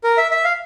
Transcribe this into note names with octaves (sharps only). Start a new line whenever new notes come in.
A#4
E5
E5
F5